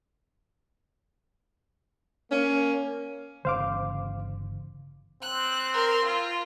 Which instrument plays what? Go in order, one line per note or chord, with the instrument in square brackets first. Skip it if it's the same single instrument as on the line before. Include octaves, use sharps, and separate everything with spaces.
[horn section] A#3 C#4
[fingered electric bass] G1 C#3 E3 [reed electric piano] C5 F5 D6
[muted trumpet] C4 [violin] F#6
[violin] A#4 C6
F4